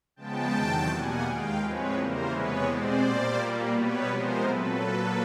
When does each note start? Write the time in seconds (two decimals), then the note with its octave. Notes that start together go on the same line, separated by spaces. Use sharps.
0.16 C#3 F3 G#3 B3 G5 A5
0.52 E2 C3 D#3 F#3
0.87 E2 B2 G3 A#3 F#5 G#5
1.22 D#2 D#3 G#3 F5 G5
1.58 A2 F3 G#3 C4 B4 C#5
1.94 E2 C#3 E3 G3 A#3 A#4 C5
2.29 E2 C3 E3 G#3 B3 B4 C#5
2.65 B2 G#3 C4 C5 D5
3.01 A#2 G3 A#3
3.35 A#2 G3 A#3
3.71 B2 G3 B3 B4 C#5
4.06 C3 F3 G#3 B3 A#4 C5
4.43 A#2 F#3 A3 C4 A4 B4
4.78 A#2 F#3 A#3